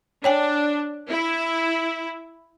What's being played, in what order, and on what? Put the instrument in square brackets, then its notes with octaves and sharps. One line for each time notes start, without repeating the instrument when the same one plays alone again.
[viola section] D4 [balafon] C#5 G5 G#5
[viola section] E4